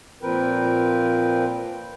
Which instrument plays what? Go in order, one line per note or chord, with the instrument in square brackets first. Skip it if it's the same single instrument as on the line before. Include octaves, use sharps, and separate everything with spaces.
[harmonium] A#2 F3 C4 A#4 B4 G5